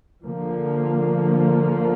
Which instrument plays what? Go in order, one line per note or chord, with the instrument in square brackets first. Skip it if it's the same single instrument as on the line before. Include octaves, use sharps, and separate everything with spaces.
[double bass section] D3 F3 A#3